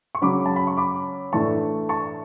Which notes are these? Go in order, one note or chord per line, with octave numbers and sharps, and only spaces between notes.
C#6
C#3 F#3 C#4 B5 D6
A5
B5
C#6
B5 D6
A2 E3 A3 D4 A5 C#6
A5 C#6